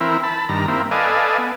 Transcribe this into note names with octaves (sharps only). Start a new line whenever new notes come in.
E3 C4 E4 A#4
A5 B5
G2 D#3 A#5
A#3 C4 E4
A4 B4 D5 D#5 F5 G#5
B3